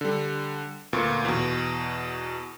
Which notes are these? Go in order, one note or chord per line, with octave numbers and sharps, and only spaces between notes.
D3 G3
D2 A#2 B3 C#6
E2 B2